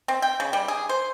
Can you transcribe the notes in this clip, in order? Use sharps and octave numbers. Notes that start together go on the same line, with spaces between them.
C4
G5
C#3
G3
G#4
C5